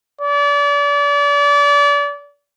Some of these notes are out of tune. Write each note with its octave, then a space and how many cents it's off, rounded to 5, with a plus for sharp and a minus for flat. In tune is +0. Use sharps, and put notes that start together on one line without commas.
D5 -35